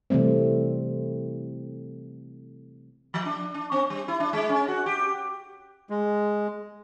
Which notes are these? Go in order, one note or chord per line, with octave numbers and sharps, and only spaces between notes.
C3 E3 G3 A3 C4
F3
D4
D4
C4
G3
E4
D4
G#3
C#4
F#4
G4
G#3